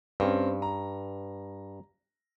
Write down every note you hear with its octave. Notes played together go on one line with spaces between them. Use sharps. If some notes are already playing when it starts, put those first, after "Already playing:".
G2 C4 C#4
A#5